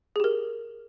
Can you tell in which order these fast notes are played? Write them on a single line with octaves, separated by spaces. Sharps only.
G#4 G4 A#4